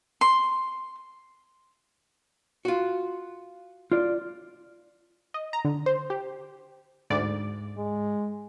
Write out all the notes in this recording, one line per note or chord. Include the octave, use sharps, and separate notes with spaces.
C6
F4 F#4
F4 D5
D#5
A#5
D3
C5
G4
D2 G#2 D5
G#3